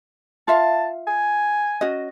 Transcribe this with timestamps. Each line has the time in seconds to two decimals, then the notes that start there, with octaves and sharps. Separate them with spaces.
0.48 F4 E5 F5 A5
1.07 G#5
1.81 C#4 F#4 D#5